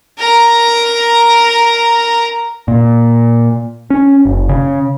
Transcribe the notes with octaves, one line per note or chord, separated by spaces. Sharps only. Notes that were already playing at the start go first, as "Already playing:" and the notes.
A#4 A#5
A#2
C#4
F#1
C#3